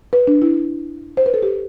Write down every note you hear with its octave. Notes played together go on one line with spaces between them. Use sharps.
B4
D4
E4
C5
B4
A4
G4